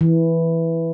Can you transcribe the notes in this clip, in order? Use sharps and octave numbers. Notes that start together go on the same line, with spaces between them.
E3